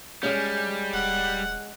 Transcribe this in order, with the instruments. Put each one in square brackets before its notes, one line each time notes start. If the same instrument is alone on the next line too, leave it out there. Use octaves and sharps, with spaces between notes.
[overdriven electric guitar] G3 [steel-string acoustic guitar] G#3 C#4
[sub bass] D#1 [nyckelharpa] F#5